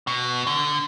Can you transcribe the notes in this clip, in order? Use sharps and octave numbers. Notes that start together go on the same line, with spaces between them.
B2
D3